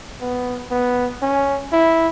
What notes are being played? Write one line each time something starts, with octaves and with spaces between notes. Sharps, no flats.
B3
B3
C#4
E4